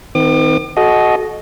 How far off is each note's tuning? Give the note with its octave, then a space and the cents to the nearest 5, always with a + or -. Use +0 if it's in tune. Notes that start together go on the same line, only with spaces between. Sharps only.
D#3 +15 C4 -35 D6 +40
F#4 +0 A4 -35 D#5 +0